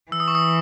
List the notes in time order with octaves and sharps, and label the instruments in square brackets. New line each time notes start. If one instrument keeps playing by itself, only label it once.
[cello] E3 [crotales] E6
[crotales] D#6
C#6
D#6